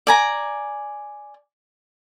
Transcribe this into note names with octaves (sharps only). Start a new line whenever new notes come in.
D5 G#5 A#5